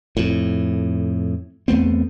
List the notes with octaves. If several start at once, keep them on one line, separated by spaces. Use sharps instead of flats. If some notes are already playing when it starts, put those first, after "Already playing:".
F2 A2
E2 A3 B3 C4